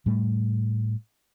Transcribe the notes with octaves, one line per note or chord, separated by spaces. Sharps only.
A2 G3 A3